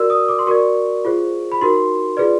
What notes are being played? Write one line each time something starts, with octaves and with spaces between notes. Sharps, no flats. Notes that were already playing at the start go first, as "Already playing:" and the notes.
Already playing: F#4 A#4 D5 E6
D#6
D6
C6
F#4 A#4 D5 C#6
F4 G#4 C5
B5
D#4 F#4 A#4 C6
F4 G#4 B4 D5